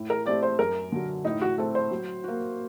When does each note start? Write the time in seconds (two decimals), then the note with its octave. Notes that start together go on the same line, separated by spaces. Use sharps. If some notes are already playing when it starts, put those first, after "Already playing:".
Already playing: A2
0.10 A#4
0.26 A3 C4 G4 D5
0.43 C5
0.59 F#2 A#4
0.92 D3 F#3
1.25 A2 D#4
1.42 F#4
1.58 A3 C4 A4
1.75 C5
1.91 F#3
2.24 A#3 F#4